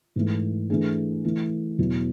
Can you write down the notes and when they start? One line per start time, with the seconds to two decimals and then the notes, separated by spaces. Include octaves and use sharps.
0.16 G#2 E3 A3
0.70 E3 A3 D4 G#4
1.25 E3 A3 E4
1.79 E2 B2 F#3 B3 E4